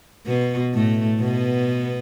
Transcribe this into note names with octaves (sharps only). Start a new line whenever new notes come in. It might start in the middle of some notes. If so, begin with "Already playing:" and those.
B2 B3
A2 A3
B2 B3